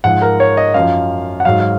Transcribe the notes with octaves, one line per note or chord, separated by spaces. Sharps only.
G#2 F3 F#5
A#4
C#5
D#5
F#2 F5
F3
F#5
G#2 F#3 F5
F5